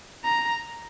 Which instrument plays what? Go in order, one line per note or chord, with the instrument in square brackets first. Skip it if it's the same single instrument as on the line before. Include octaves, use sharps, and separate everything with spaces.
[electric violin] A#5